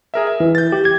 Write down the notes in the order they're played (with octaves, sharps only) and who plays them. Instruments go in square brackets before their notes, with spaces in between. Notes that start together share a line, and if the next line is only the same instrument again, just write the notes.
[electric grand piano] G#4 A#4 E5
E5
[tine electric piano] E3
[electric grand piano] G6 A6
[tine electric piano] G4
G#6